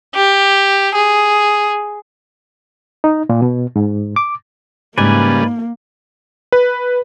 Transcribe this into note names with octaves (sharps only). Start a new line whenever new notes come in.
G4
G#4
D#4
A#2
B2
G#2
D6
G#2 C#3 G3 A#3 B4 D5 G#5
B4